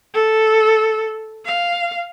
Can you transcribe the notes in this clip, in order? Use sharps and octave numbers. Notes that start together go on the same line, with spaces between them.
A4
F5